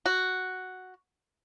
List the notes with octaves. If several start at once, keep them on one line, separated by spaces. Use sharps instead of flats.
F#4